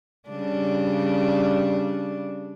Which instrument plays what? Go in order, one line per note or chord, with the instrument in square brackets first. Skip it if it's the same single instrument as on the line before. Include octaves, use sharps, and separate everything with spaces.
[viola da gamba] C#3 G3 D4